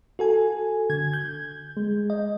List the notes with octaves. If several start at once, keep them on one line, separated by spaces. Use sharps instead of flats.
F#4 A4 G#5
D3 G#6
G6
G#3
D#5